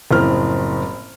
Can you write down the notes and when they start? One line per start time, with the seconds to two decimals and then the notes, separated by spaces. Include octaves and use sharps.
0.11 F#1 A2 F3 C4 F6